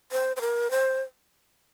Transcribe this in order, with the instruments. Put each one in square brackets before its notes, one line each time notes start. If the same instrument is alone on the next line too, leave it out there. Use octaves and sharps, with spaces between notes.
[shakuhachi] C5
C5
A#4
C5